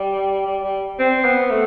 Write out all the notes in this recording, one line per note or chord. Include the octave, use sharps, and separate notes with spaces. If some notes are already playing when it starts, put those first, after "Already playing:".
Already playing: G3
G3
G3
C4
B3
A3